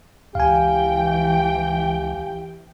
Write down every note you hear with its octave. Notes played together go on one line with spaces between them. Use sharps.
C#2 E3 G4 F5 G5 G#5